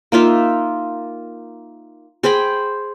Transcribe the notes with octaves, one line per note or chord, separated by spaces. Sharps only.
A#3 D#4 F4 E5
G#4 C5 G5 B5